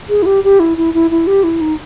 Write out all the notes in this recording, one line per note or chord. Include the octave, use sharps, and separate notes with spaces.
G#4
E4
G4
G4
E4
E4
E4
E4
G4
E4
D#4